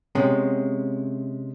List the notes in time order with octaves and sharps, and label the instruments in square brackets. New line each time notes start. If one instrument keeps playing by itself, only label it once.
[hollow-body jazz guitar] C3 G#3 B3 C#4